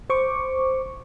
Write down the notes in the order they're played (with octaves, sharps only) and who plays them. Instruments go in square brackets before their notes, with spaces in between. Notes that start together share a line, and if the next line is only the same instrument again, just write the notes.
[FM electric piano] C5 C#6 D6